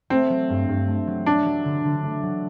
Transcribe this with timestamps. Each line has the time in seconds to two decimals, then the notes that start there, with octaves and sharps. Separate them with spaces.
0.10 A3 C4
0.30 F#3
0.50 G2
0.69 G2
0.88 A3
1.07 F#3
1.26 A3 D4
1.46 F#3
1.65 D3
1.84 D3
2.03 A3
2.23 F#3